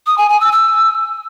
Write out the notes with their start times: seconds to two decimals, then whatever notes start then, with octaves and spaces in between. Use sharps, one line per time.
0.07 D#6
0.18 G#5
0.29 G#5
0.41 E6
0.52 E6